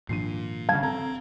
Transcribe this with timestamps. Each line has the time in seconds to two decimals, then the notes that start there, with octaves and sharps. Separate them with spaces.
0.09 G#1 A#2 F3 D4 C7 D#7
0.69 G2 C#3 F5 A5 G#6
0.83 C4 A4 A#5